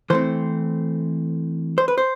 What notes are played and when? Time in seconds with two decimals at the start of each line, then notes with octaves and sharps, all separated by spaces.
0.10 E3 A3 C4 C5
1.78 C5
1.88 B4
1.98 C5